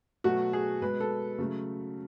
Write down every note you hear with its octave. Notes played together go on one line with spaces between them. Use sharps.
B2 F#3 A3 F#4
G#4
B2 G#3 B4
A4
C#3 F#3 A3